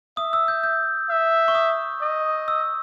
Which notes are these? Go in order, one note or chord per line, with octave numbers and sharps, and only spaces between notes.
E5 D#6
E6
G6
G6
E5
C#6
D#6
D#5
E6